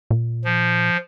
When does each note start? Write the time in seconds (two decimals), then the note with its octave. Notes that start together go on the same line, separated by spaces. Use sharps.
0.11 A#2
0.45 F3